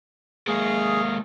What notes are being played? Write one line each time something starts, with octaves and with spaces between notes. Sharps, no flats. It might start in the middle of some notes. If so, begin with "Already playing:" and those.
G#3 A#3 G#4 C#5 D#5 F5